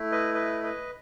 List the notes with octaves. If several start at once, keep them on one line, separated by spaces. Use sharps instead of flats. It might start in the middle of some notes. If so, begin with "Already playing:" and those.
Already playing: A3 E4
B4 D#5
B4 D#5
B4 D#5